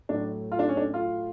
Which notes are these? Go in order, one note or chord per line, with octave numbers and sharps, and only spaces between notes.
A2 F#3 A3 D4
F4
D4
C#4
D4
F4